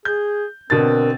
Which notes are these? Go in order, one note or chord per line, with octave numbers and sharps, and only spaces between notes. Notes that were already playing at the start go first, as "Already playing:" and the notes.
G#4 G6
B2 D3 C4 A#4 A6